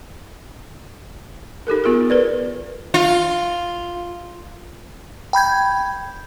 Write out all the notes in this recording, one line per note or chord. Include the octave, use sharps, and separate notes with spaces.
D#4 G4 A4 A#4
B3 F4 G#4 A#4
A#4 B4 D5
F4
G5 B5 G6 G#6